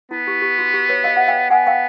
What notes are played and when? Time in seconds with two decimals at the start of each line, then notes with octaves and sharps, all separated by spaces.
0.11 B3 E4
0.27 G4
0.42 G4
0.59 F#4
0.74 G4
0.89 B4 C#5
1.04 D#5 F5
1.16 E5 F#5
1.28 F5 G5
1.51 B3 F#5 G#5
1.67 F5 G5